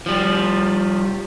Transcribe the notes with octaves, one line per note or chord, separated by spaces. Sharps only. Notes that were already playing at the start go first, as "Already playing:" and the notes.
F3 G3